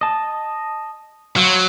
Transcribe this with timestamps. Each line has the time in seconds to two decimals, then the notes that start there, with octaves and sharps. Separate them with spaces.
0.01 D#5 A5
1.36 F#3 C5 C#5 F5